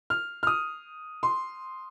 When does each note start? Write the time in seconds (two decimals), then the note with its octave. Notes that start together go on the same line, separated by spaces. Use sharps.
0.10 F6
0.43 F6
0.47 D#6
1.23 C6